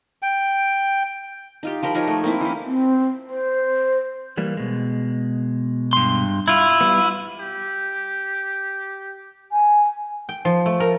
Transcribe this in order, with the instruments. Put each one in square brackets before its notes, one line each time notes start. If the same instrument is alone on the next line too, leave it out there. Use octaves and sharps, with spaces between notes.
[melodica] G5
[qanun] D#4 F4 G4
F3 G4 A#4 B5
F3 D#4 A#4 C#5
A3
A#3 C4 E4
E3 C#4
[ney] C4
C5
[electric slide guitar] E3 G3 A#3
B2 G#3
[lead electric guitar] G2 C6
E4 F4
[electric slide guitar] G3 B3
[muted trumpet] G4
[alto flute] G#5
[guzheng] G5
F3
A3
A#4